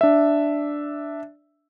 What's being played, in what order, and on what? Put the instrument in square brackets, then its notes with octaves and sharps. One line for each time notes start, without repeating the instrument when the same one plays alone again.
[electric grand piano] D4 E5